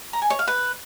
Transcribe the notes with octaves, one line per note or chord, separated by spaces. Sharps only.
A#5
G#5
C#5
F5
B4